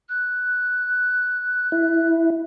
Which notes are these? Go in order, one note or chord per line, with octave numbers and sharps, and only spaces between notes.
F#6
E4